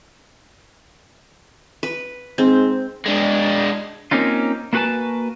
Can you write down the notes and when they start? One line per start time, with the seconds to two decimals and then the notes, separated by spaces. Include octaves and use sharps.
1.83 B4
2.38 G#2 C4
3.06 G#3 D4
4.11 A#3 C4 C#4 D#4 F4
4.73 A#3 B3 F#4 B4 G#5 A5